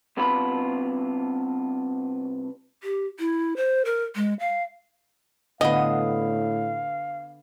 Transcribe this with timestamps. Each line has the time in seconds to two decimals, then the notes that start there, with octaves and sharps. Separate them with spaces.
0.17 C2 C3 B3 D4 F4 B5
2.83 G4
3.19 E4
3.57 C5
3.85 A#4
4.16 G#3
4.40 F5
5.61 A2 D3 B3 D#5 F5